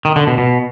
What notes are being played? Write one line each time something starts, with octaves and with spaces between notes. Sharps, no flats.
D#3
D3
B2
B2